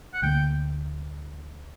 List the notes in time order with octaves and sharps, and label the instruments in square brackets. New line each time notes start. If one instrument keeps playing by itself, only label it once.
[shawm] F#5
[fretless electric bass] D2 D3 F#3 A#3 [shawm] G5